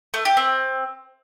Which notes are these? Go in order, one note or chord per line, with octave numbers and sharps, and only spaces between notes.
A3
G4
C4